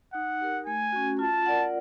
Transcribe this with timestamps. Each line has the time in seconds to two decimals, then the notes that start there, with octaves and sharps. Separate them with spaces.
0.14 D#4 F#5
0.41 G4 A#4
0.66 A3 G#5
0.92 C#4 F#4
1.19 F4 A5
1.46 A#4 D5 F#5